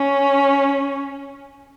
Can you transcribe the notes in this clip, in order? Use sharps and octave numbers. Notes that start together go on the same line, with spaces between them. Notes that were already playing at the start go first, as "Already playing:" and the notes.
Already playing: C#4